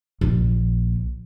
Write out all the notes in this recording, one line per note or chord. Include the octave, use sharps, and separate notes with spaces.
A#1 D#2